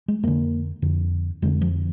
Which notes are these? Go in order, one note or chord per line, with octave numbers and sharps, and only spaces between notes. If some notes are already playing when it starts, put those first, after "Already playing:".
G#3
F2 D3 A#3
F2 D3
F2 D3 G#3
F3